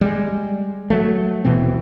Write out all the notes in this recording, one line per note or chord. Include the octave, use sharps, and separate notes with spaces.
G3 G#3
F#3 A3
D#1 B2 E3 C4